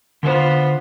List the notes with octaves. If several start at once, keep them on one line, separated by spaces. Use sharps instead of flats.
D3 B3 F4 C5